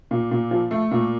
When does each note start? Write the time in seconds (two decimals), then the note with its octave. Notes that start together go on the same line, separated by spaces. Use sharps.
0.11 A#2
0.31 A#2
0.51 F3
0.71 A3
0.91 A#2